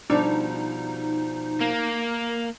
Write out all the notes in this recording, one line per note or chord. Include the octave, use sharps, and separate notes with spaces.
B2 F3 G3 D4 D#4
A#3